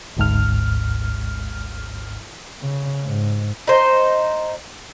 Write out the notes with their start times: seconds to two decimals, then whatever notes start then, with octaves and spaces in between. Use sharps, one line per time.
0.17 G#1 D2 G#2 F6
2.62 C#3
3.05 G#2
3.67 D#4 C5